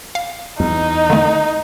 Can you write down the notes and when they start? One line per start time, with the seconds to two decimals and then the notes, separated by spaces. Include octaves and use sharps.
0.15 F5
0.60 E2 D#4
1.10 D3 D#3 A3